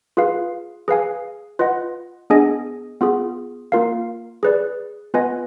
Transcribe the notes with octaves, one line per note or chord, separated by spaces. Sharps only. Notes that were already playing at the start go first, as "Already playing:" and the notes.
F4 G#4 B4 F5
G#4 B4 F5 G#5
F4 B4 D#5 F#5
B3 D4 G#4 D#5 G#5
B3 F4 G#4
A#3 F4 A#4 F5
G#4 B4 D5
B3 F4 B4 D#5 G#5